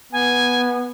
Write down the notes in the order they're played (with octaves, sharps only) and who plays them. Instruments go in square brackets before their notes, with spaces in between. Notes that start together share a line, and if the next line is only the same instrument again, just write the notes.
[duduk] B3 [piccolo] G#5